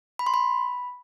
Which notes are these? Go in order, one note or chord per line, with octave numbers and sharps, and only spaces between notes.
B5
C6
B5